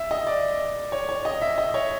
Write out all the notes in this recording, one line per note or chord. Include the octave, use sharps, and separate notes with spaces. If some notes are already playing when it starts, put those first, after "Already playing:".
Already playing: E5
D#5
D5
C#5
C#5
D#5
E5
D#5
C#5